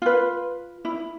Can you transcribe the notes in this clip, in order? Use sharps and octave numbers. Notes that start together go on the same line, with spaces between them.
F4 B4
E4